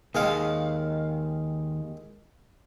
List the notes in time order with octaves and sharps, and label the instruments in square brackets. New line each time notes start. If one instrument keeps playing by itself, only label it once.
[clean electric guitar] D#2 F5 [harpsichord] D#3 G#3 G#4